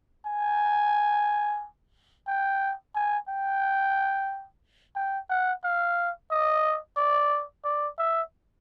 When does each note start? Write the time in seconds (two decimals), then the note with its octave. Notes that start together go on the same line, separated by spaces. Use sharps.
0.26 G#5
2.27 G5
2.95 G#5
3.29 G5
4.96 G5
5.29 F#5
5.64 F5
6.31 D#5
6.97 D5
7.65 D5
7.98 E5